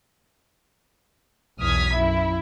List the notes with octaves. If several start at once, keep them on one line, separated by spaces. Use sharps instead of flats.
B1 E2 D#6 F6 G#6 B6
F#2 E4 E5